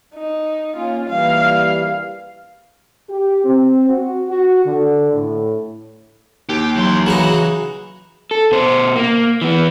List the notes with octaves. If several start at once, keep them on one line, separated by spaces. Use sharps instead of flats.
D#4
A#3 C#4 F4
E3 G3 A#3 F5
G4
C4
F#4
F#4
D3
A2
D#2 G4
E3 F#3 C6
C#3 E3 D#4 F#4
A4
B2 C5
A#3
E3 B3